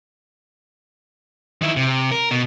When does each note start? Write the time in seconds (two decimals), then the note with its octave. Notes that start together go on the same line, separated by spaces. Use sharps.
1.62 D#3 E4
1.77 C3
2.11 A#4
2.31 B2